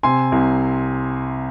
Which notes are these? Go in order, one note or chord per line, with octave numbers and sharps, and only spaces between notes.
C3 G#5 C6
C2